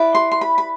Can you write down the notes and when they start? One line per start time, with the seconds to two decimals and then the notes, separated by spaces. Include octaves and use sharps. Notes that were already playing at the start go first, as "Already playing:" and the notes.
Already playing: E4 B4 D5
0.15 C6
0.32 C6
0.41 B5
0.58 B5